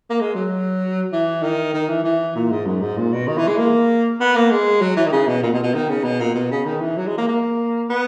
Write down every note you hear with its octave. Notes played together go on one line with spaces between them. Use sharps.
A#3
G#3
F#3
E3
D#3
D#3
E3
E3
A#2
G#2
F#2
G#2
A#2
B2
D#3
E3
G#3
A#3
B3
A#3
G#3
F#3
E3
D#3
C#3
B2
A#2
B2
B2
D#3
C#3
B2
A#2
B2
C#3
D#3
E3
F#3
G#3
A#3
A#3
B3